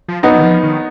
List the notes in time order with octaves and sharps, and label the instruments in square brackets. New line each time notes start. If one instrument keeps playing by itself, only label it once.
[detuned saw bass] F3
[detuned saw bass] F#3 [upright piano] B3 D#4
[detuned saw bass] D#3
F3
D#3